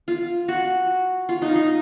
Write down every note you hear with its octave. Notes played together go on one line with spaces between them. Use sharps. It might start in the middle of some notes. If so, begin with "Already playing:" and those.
F4
F#4
F4
D#4
F4
D#4